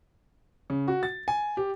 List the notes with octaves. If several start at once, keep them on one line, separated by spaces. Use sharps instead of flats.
C#3
F#4
A6
G#5
G4